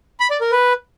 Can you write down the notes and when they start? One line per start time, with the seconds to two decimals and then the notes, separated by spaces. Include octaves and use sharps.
0.20 B5
0.30 D5
0.41 A#4
0.51 B4